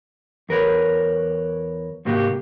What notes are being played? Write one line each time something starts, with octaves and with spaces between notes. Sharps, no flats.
E2 A#4 B4 C#5
G#2 C3 A#3 F#4 G4